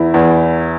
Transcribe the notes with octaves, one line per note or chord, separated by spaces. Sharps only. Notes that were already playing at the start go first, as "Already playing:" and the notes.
Already playing: E2 E4
E2